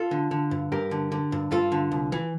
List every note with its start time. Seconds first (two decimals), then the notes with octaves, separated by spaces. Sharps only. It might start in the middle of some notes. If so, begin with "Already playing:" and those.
Already playing: F4 A4
0.11 D3
0.31 D3
0.51 G2
0.72 G2 G4 A#4
0.91 D3
1.12 D3
1.32 G2
1.51 G2 F4 A4
1.72 D3
1.92 C2
2.12 E3